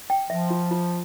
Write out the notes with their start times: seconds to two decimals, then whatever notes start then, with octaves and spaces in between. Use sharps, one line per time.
0.10 G5
0.30 F3 E5
0.50 F4
0.71 F4